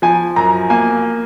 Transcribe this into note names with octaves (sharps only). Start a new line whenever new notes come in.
F3 G#5
F#2 A#5
A#3 G#5